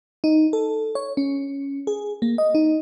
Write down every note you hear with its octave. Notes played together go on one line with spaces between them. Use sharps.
D#4
A4
C#5
C#4
G#4
A#3
D#5
D#4